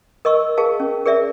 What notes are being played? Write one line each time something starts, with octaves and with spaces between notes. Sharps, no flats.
A#4 D#5 C#6 E6
G#4 A#4 F5 A5
C#4
G#4 A#4 D5 E5